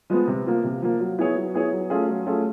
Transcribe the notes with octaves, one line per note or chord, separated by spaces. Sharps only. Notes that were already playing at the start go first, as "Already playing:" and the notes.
F3 G#3 B3
C3
F3 A#3
C3
F3 A#3
F#3
B3 E4 G#4 C#5
F#3
B3 E4 G#4 C#5
F#3
A3 C#4 F4 G#4
F#3
A3 C#4 F4 G#4